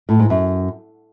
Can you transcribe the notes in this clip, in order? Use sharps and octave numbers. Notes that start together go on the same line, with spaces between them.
A2
G#2
F#2